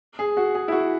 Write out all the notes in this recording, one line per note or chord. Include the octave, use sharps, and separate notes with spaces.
G#4
F#4
G#4
E4
F#4